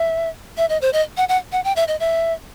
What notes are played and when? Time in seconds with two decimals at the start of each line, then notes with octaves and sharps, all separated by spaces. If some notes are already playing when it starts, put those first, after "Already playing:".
Already playing: E5
0.57 E5
0.69 D#5
0.82 C5
0.93 D#5
1.17 F#5
1.29 F#5
1.52 F#5
1.64 G5
1.76 E5
1.88 D#5
2.00 E5